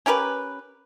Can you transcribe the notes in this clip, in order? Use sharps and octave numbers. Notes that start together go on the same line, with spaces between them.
C#4 G4 A#4 B4